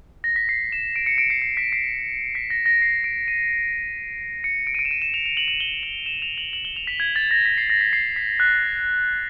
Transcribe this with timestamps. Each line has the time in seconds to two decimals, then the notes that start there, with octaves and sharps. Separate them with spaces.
0.24 A#6
0.36 B6
0.49 C7
0.72 E7
0.96 D7
1.06 C#7
1.18 D7
1.30 C7
1.42 C7
1.57 B6
1.72 C7
2.35 B6
2.50 A#6
2.66 A#6
2.82 C7
3.04 D7
3.28 D#7
4.44 C#7
4.67 D7
4.75 D#7
4.79 D7
4.85 E7
4.91 D#7
5.02 E7
5.14 F7
5.26 F7
5.37 F#7
5.48 F#7
5.60 G7
5.83 F#7
6.06 E7
6.22 F7
6.38 F#7
6.53 F#7
6.65 G7
6.76 F7
6.87 B6
7.00 G#6
7.16 A6
7.31 A#6
7.46 B6
7.58 C7
7.70 A#6
7.81 B6
7.93 C7
8.16 B6
8.40 F#6